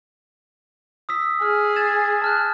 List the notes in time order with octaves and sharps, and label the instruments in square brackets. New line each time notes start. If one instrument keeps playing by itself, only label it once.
[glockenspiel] D#6 E6 B6
[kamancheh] G#4 [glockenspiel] F6
[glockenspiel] G#6 A6 E7
A5 F6 F#6